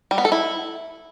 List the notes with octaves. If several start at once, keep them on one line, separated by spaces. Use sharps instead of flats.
G3
B3
A4
E4